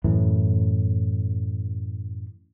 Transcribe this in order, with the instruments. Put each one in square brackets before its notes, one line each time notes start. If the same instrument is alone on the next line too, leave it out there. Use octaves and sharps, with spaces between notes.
[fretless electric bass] F#2 A2 E3